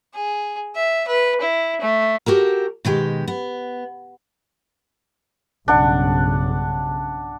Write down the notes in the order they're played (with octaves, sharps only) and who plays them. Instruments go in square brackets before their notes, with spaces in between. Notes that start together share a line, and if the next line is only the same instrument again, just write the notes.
[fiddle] G#4
E5
B4
E4
A3
[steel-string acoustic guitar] F#4 G4 A4 A#4
B2 D#3 G#3 G4
B3
[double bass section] B1 G2 C#3 [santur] D4 F#5